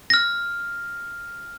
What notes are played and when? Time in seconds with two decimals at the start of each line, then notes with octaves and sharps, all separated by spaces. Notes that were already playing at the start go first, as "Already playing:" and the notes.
0.10 F6 A#6